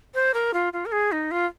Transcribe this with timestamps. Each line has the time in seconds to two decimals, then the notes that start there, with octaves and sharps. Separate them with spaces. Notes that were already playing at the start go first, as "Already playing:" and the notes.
0.14 C5
0.34 A#4
0.54 F4
0.73 F4
0.86 A#4
0.92 G#4
1.12 D#4
1.31 F4